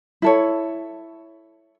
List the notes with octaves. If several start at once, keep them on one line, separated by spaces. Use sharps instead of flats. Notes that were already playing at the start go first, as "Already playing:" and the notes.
E4 A4 C#5